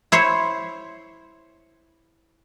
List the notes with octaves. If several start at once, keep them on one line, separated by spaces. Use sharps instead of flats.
E4 C5 C#5